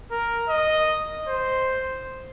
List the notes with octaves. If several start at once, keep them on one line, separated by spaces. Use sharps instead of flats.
A#4
D#5
C5